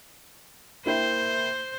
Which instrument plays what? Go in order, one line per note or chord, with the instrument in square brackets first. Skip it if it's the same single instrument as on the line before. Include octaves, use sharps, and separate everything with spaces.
[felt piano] A#3 E4 G5 [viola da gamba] C5